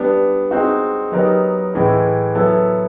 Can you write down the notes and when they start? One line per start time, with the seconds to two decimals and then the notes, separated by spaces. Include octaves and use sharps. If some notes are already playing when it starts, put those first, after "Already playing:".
Already playing: G3 B3 D4
0.51 G#3 C4 D#4 F#4
1.12 F#3 B3 D#4 G4 A#4
1.74 A2 E3 G#3
2.35 F#3 B3 E4 A4